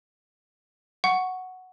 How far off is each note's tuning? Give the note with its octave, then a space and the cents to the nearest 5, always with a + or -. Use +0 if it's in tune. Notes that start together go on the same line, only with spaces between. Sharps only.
F#5 +0 C#6 +0